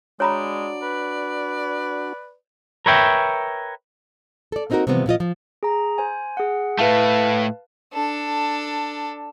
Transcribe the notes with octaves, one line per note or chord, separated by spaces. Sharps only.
G#3 D4 F#4 C#5 D5 A#5 B5
B4
A#4 B4 C#5 E5 G5
A4 D5
A#3 C4 D#4 F4 F#4 A#4
C3 E3 F3 G3 B3 C4
A#2 F3 F4 D#5
F3
G#4 A#5
C5 G#5
G#4 F#5
A2 A3 B4 F5 A5
D4 A4